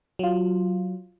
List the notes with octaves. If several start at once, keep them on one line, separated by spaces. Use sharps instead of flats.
F#3 F4